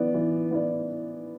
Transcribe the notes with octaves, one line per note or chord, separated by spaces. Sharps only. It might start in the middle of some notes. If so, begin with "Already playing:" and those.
Already playing: E3 B3 E4 D5
E3
B3 E4 D5